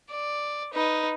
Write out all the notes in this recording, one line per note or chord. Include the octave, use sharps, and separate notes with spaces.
D5
D#4 B4